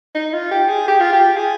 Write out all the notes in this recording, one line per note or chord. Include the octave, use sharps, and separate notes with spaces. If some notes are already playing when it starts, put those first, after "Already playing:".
D#4
F4
G4
G#4
G4
F4
G4
G#4